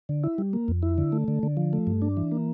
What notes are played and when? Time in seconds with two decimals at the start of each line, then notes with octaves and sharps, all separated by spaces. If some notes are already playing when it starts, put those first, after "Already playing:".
0.09 D3
0.24 E4
0.38 G3
0.53 A#3
0.68 F2
0.83 E4
0.98 D3
1.12 A3
1.28 D3
1.43 D3
1.57 F3
1.73 A3
1.87 G2
2.02 D4
2.17 E3
2.32 A#3